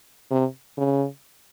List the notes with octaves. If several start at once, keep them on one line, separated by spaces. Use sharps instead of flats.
C3
C#3